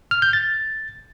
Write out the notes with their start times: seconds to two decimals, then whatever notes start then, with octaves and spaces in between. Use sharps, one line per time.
0.11 F6
0.22 G6
0.33 A6